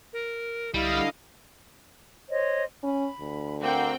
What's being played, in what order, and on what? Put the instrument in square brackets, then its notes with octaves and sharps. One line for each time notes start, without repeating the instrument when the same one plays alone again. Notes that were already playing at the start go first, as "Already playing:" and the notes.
[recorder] A#4
[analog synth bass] C2 [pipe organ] D3 D#5 F5 [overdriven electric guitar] G3 [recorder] E4
[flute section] C5 C#5 D#5
[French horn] C#4 [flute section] B5
[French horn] D2
[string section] C4 F#4 G5 [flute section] A#4 F5 D6